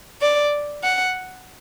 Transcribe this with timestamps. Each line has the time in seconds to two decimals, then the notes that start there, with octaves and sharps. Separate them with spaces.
0.22 D5
0.83 F#5